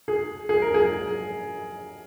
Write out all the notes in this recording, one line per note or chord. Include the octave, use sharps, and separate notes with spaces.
G#4
G#4
A#4
G#4